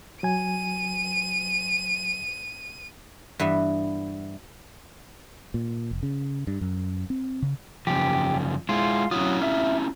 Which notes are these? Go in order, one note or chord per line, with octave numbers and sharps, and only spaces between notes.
F#3 G#5 D#7
G2 E3 B3 E5
A#2
F1
C#3
G2
F#2
C4
C#3
F#2 C#3 F3 G4
G#3 E4 F4
F#3 C#4 E4 F4 D#6
E5 F6